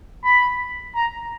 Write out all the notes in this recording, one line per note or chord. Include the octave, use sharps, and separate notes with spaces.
B5
A#5